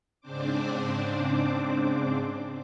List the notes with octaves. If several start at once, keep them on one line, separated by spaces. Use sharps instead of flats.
G#2 C#3 C4 D4 C5 D6